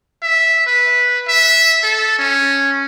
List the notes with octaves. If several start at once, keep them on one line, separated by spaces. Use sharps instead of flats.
E5
B4
E5
A4
C#4